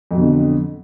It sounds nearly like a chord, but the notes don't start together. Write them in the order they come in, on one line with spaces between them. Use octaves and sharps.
F2 F#3 B2 D3